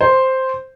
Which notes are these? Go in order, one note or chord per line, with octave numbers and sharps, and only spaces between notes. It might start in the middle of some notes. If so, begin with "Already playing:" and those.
C5